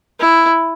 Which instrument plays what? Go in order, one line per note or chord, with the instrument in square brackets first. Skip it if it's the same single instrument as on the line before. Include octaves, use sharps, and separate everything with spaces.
[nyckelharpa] E4